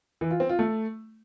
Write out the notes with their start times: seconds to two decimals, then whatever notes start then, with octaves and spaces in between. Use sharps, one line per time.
0.21 E3
0.31 F4
0.40 C4
0.49 F4
0.59 A3